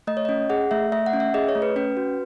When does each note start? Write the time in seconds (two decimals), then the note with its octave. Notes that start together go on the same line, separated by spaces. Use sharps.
0.07 A3 D#5
0.17 C#5
0.25 C#4 D#5
0.50 G#4 F#5
0.71 A3 E5
0.92 A3 E5
1.06 F#5
1.13 C#4
1.20 E5
1.34 G#4 D#5
1.49 C#5
1.55 A3
1.62 B4
1.76 C#4 B4
1.97 F#4